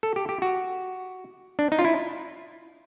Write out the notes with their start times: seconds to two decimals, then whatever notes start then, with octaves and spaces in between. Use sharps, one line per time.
0.03 A4
0.16 G4
0.29 G4
0.42 F#4
1.59 D4
1.72 D#4
1.79 F4
1.85 E4